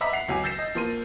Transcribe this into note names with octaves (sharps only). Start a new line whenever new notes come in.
D#5 E5 A#5 B5 D6 B6
F#5 C7 F7
C#2 F#3 G#5 D6
E6 G6 A6 A#6 C7 E7
D#5
F3 A#3 C6 D#7